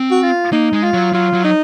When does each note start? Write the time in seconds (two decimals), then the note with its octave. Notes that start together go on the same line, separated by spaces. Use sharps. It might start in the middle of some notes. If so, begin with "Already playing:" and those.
Already playing: C4
0.11 F#4
0.23 F4
0.52 A#3 D#4
0.73 G#3
0.83 F4
0.93 F#3
1.13 F#3 F4
1.33 F#3
1.44 D#4